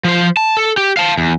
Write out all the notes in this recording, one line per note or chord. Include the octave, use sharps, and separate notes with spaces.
F3 C5
A5
A4
G4
F5 A5
E2